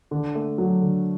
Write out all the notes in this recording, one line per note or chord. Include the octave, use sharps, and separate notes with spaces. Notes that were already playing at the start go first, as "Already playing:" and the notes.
D3
A3
F#3
D3